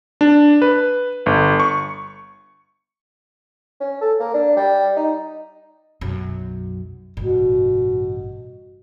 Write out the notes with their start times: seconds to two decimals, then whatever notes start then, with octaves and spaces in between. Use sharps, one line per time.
0.21 D4
0.62 B4
1.26 G1
1.60 C#6
3.81 C#4
4.01 A4
4.20 A#3
4.34 D4
4.56 G3
4.97 D#4
6.01 B1 F#2
7.17 A1 G2 B2